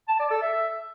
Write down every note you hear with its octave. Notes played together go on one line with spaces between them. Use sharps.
A5
D5
A4
E5